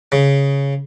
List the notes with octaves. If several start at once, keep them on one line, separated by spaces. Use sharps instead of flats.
C#3